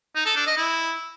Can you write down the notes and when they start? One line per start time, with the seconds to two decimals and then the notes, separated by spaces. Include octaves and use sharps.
0.15 D#4
0.26 A4
0.36 D4
0.47 D#5
0.57 E4